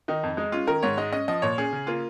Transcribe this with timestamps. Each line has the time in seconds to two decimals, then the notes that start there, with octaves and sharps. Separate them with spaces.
0.08 D#3 D#4
0.23 F2
0.37 G#3 D#4
0.52 C#4 F4
0.67 D#3 A#4
0.83 G#2 C#5
0.97 G#3 D#5
1.12 C#4 D#5
1.28 F3 D#5
1.42 A#2 C#5
1.58 C#4 G#4
1.73 C#3
1.87 A#3 F4